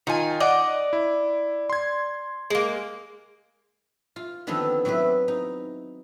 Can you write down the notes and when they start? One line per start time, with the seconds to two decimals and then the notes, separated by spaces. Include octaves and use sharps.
0.07 D#3 D#4 F4 G#5
0.40 D5 D#5 F#5
0.93 E4
1.70 C6 G#6
2.50 G#3 A#3
4.16 F4
4.47 D3 D#3 F3 B3 C4 A4
4.85 F#3 B3 C4 E4 B4
5.28 D#4